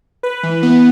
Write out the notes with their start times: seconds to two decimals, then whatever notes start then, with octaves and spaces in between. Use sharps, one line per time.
0.23 B4
0.43 E3
0.63 B3